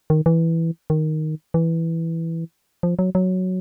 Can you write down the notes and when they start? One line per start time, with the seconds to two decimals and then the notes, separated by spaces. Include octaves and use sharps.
0.10 D#3
0.26 E3
0.90 D#3
1.54 E3
2.83 F3
2.99 F#3
3.15 F#3